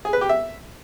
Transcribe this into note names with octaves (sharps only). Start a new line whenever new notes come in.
G#4
B4
G4
E5